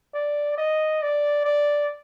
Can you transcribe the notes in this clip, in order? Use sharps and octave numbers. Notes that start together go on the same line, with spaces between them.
D5
D#5
D5
D5